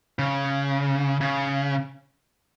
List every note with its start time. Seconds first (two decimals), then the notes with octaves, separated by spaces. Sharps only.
0.19 C#3
1.21 C#3